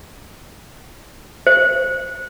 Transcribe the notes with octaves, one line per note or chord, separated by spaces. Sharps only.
C5